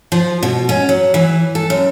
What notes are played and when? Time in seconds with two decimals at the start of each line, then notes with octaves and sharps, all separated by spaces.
0.12 F3
0.43 B2
0.69 C#4
0.89 F#3
1.14 E3
1.55 A4
1.70 F#2